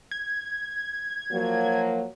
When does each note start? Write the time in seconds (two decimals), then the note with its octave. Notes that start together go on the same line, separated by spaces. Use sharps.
0.11 G#6
1.31 F3 F#3 A#3